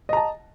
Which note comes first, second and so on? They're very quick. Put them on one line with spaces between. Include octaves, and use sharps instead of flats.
D#5 A#5 A5